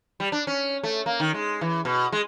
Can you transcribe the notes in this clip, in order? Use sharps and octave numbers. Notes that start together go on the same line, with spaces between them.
G3
D4
C#4
A3
A#3
D#3
G#3
E3
B2
G#3